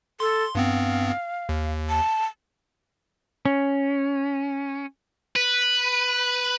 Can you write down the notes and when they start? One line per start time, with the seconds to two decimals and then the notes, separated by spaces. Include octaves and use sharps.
0.20 A4 C6
0.55 G2 B3 C4 F5
1.49 D#2
1.89 A5
3.45 C#4
5.36 B4